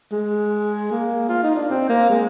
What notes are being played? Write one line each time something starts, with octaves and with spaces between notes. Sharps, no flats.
G#3
A#3
F4
D#4
D4
C4
A#3
G#3